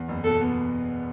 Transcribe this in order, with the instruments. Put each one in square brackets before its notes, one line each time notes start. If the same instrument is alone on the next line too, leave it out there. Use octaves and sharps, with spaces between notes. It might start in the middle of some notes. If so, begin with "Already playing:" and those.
Already playing: [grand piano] E2
F#1
[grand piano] B2 [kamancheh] A4
[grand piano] B3